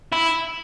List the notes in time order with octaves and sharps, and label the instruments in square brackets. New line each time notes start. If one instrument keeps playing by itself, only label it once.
[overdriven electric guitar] E4